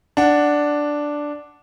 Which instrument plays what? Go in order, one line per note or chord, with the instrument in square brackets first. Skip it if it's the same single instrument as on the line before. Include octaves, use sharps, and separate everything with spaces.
[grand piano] D4 F#5